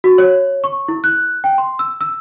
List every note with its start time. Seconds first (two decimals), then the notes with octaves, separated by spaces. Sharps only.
0.04 F#4
0.18 C#5
0.64 C#6
0.88 E4
1.04 F#6
1.44 G5
1.58 C6
1.79 E6
2.01 E6